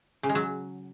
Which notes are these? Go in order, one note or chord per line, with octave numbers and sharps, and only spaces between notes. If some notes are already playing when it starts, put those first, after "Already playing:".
C#3
G#3
F#3